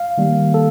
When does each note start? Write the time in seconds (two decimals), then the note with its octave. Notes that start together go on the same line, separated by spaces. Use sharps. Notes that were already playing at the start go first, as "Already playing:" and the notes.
Already playing: F5
0.18 D#3 G3 A#3
0.54 A4